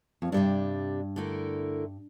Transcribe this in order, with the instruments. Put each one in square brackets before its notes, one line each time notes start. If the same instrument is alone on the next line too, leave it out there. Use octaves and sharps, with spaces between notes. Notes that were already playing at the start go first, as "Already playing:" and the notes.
[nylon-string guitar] F2
[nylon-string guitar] G2 [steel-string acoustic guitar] C3 G3 D4
[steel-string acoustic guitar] D3 A3 E4 A#4